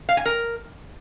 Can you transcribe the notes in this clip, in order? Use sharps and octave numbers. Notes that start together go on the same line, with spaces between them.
F5
G#5
A#4